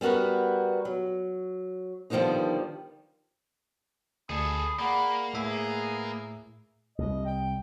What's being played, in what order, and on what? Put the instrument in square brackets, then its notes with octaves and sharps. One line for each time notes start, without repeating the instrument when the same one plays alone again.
[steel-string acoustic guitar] G3 B3 F#4 A#4 B4
F#3
D3 D#3 F3 G3 B3 D#4
[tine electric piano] D2 [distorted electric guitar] G#4 A4 [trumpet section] B5 D#6
[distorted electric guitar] A#3 [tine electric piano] G#4 D5 [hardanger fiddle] F#5 [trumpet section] B5
[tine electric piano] A2 E5 [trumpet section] B3 [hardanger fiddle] G#4
[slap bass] C2 [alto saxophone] D#5
[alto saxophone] G5